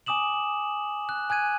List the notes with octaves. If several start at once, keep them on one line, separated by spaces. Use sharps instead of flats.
G#5 D6 D#6 E7 F#7
F#6
G#5 F#6 G#6 D#7